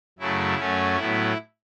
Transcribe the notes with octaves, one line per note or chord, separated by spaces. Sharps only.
F#2 C#3 F#3 A3 E4
F#2 F#3 A3 C#4
A2 F#3 B3 E4